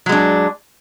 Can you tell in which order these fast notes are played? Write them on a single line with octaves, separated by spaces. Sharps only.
F#3 G#3 D4